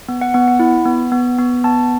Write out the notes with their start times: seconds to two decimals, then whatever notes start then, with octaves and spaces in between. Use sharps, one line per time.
0.09 B3
0.21 F#5
0.34 B3 F#5
0.48 F#5
0.59 E4
0.86 B3
1.12 B3
1.39 B3
1.64 B3 A5